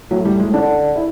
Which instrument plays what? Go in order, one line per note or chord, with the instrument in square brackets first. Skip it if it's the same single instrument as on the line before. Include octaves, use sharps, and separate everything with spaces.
[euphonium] A2 [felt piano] F#3
[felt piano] G3
G#3
[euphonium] D3 [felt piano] D4
[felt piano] E4